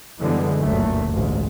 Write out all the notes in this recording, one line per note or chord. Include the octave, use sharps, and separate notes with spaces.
F#2 D3 E3 G3 G#3 B3
F#1 D2 G2 A#2 F#3 A3
A1 D2 G#2 G#3